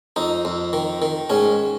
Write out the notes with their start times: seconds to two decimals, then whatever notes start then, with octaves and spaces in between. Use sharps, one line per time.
0.16 F2 D#4
0.45 F2
0.73 D#3
1.02 D#3
1.30 G#2 C#4